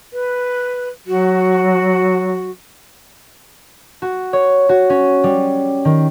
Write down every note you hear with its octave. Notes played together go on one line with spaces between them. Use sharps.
B4
F#3 F#4
F#4
C#5
F#4
C#4
G3
D#3